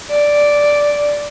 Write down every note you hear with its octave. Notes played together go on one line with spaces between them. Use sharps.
D5